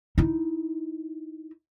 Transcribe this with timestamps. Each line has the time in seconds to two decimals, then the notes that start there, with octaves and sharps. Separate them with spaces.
0.18 D#4 E4